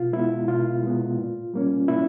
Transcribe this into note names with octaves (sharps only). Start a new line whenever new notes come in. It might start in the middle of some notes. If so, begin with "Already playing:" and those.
Already playing: B2 F4
G#3 B3 E4
B2 F4
G#3 B3
A#2
G3 A#3 C#4
A#2 E4